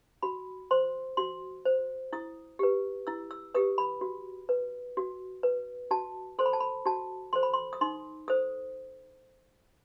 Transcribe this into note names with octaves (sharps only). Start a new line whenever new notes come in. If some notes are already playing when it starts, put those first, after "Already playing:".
F#4 B5
C5 C6
F#4 C6
C5
E4 D#6
G4 B4
E4 E6
E6
G4 B4 D#6
B5
F#4
B4
F#4
B4
F#4 A5
A4 C5 C6
B5
A5
B5
F#4 A5
A4 C5 C6
B5
C6
D#6
D#4 C6
A4 C5 D#6